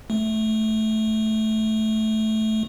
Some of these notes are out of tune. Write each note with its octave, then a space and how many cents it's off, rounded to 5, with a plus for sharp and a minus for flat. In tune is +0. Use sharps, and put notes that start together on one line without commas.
A3 -10